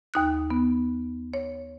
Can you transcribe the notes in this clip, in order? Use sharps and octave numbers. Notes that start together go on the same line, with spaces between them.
D#2 D#4 F#6
B3
C#5